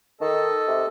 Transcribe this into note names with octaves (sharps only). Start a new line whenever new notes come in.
D#3 A4 D#5 A5
C3